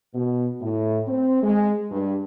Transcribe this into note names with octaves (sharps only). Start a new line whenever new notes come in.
B2
A2
C4
G#3
G2